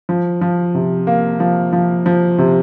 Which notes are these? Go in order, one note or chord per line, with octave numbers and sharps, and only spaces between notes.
F3
F3
C3
A#3
F3
F3
F3
C3